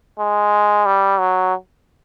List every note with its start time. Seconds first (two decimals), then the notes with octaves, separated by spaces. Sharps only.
0.19 G#3
0.86 G3
1.19 F#3